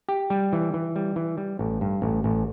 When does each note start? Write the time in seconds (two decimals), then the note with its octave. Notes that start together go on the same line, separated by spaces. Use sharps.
0.09 G4
0.30 G3
0.53 E3
0.74 E3
0.96 G3
1.16 E3
1.37 G3
1.59 A1
1.81 G2
2.02 A1
2.24 A1